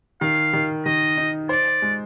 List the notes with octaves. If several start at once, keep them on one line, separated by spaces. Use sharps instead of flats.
D#3 F5
D#3
D#3 D#5
D#4
C5 D5
G#3